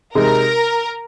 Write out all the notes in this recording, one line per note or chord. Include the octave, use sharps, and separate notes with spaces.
C3 G#3 D#4 A#4